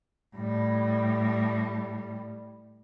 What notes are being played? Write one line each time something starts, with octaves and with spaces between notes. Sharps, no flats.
A2 G3